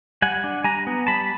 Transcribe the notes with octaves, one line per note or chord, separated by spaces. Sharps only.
G3 F#5 G#5
D4
G3 G#5 A#5
B3
G3 A5 B5